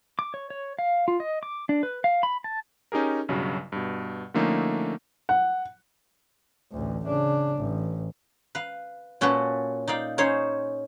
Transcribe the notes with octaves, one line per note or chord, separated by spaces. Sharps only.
D6
C#5
C#5
F5
F4
D#5
D6
D4
B4
F5
B5
A5
C#4 D#4 G4 G#4 A#4
B1 G2 C#3 F#3
G2 B2
D3 F3 A3 A#3 C#4 D#4
F#5
A1 D2
C#3 D4
A1
B4 F5
A#2 C#4 F#4 A4 B4
D#4 D5 F5 G5
C#4 D#4 G#4 C5 C#5